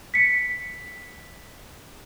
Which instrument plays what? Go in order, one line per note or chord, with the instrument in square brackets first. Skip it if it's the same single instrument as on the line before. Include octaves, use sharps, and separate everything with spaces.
[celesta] B6 C#7